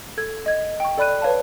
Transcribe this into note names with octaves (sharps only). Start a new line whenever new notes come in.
A4 G#6
D#5 G#6
G5 C#6
A4 D5 B5 F#6 D#7
B4 C#5 F5 A5